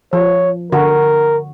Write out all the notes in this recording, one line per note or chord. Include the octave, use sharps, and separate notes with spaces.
F3 C#5
D3 F#4 A#4